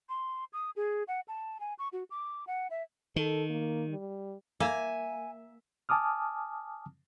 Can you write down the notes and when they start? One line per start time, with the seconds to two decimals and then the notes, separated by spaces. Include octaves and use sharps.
0.09 C6
0.53 D#6
0.76 G#4
1.08 F#5
1.28 A5
1.60 G#5
1.79 C#6
1.93 F#4
2.10 D6
2.47 F#5
2.70 E5
3.16 D#3 A4
3.50 A#3
3.89 G3
4.60 A#3 E5 G#5
5.89 G#5 A5 D6 D#6 F6